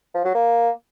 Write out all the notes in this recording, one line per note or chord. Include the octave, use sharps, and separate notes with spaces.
F3
F#3
A#3